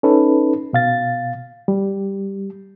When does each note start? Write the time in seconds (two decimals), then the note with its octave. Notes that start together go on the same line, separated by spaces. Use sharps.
0.03 C#4 D#4 A4 B4
0.73 B2 F5 A6
1.68 G3